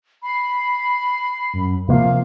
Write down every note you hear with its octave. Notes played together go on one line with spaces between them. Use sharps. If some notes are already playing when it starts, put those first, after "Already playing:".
B5 C7
F#2
C3 F3 A#3 F5